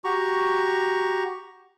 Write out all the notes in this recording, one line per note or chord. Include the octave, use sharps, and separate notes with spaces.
F#4 G4 A#5 C#6